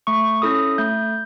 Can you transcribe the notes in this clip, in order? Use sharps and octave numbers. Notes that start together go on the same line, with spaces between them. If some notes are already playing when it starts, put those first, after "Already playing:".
A3 C#6
C#4 E4 A4 D#6
A3 G6